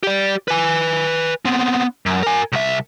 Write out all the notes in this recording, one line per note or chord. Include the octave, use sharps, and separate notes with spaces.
G4 D5
B4 G#5
B3 C4
F#2
A#4 G#5
C2 E5